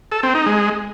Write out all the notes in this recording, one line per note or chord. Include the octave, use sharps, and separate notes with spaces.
A4
C4
D#4
G#3